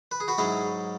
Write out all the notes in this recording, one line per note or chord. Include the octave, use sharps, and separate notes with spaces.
B4
G#4
F#4 B4
G#2 F#3 C#4 E4 G#4